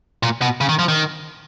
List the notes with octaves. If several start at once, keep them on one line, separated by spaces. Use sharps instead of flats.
A#2
B2
C#3
D#3
F3
D#3